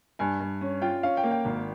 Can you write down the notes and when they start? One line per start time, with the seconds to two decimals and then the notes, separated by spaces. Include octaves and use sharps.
0.19 G2 G#5
0.40 G2
0.61 C#4
0.82 F4 G5
1.03 C#4 F5
1.17 G5
1.24 A#3
1.31 G5
1.45 G#1